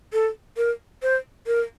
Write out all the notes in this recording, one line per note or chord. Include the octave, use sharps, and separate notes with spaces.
A4
A#4
C5
A#4